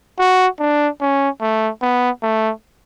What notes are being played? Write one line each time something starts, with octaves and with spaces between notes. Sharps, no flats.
F#4
D4
C#4
A3
B3
A3